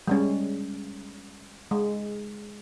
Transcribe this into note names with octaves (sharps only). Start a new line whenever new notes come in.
G3 G#3 C#4
G#3